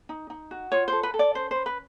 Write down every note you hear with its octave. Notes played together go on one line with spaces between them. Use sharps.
D#4
D#4
F#4
F4 C#5
A4 C5
B4
A4
D5
C#4 C5
B4 C5
B4